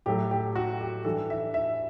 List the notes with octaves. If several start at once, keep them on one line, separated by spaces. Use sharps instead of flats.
A2 F#3 A3 G4
G4
F#4
G4
G2 E3 G3 A4
E5
E5